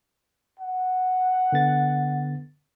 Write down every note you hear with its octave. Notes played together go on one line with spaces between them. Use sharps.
F#5
D3 B3 A6